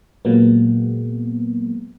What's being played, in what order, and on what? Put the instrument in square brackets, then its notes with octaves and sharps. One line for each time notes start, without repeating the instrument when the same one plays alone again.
[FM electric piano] A#2 F#3 G#3 A#3 B3